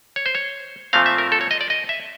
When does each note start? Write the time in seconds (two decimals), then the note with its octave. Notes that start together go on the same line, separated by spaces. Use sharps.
0.16 C#5
0.26 C5
0.35 C#5
0.93 A#2 F3 A3 C4 F5
1.06 E5
1.18 A#4
1.32 A4
1.41 C#5
1.51 D#5
1.61 D5
1.70 D#5
1.89 E5